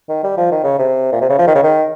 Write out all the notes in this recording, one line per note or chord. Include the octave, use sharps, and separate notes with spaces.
D#3
G3
F3
D#3
C#3
C3
A#2
C3
C#3
F3
D#3
C#3
D#3